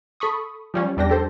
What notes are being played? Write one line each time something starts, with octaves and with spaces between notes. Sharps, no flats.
A4 B5 C#6 D#6
F3 G3 C#4
E2 G3 D4 G5 A#6
G4 A4 C5